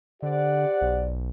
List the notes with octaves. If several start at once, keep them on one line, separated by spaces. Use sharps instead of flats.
D3 G4 C5 D5 F#5
B1